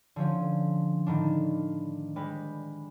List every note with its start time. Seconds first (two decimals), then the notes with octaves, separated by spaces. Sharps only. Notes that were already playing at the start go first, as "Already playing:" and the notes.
0.16 D3 F3 C#4
1.06 A2 D#3 D4
2.16 G3 G#3 B4